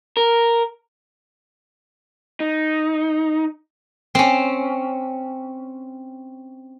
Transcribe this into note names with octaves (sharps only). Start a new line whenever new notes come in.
A#4
D#4
C4 C#4